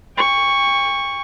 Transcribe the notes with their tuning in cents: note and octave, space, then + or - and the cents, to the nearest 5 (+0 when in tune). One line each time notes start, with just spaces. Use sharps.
G5 +40 C#6 +0